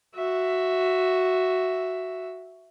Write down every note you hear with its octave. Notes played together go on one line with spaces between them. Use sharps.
F#4 E5